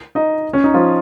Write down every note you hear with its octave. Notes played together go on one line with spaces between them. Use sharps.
D#4 D#5
C#4
D#4
F3 F4